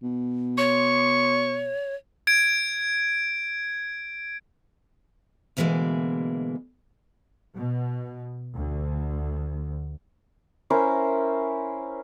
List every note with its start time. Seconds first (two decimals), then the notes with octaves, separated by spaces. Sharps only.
0.02 B2
0.58 C#5 C#6
2.27 G#6 D7
5.57 D2 B2 E3 F#3 G#3 A#3
7.56 B2
8.56 D2
10.70 C#4 E4 A#4 C5